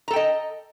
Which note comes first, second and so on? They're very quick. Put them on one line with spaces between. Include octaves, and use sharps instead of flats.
A#5 A4 G5 D#5